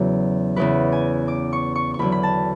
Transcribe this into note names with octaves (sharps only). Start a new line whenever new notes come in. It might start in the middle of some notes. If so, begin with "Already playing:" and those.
Already playing: E2 C#3 F#3
E2 C#3 E3 B4
G#5
D6
C#6
C#6
C#6
E2 D3 F#3 B5
B5
A5